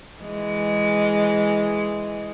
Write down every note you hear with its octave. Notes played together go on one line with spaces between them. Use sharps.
E3 G#3